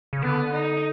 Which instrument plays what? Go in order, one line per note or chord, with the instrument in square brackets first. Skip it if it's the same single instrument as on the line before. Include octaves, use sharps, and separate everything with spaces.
[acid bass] C#3
[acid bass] D3 [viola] B3
[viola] D#4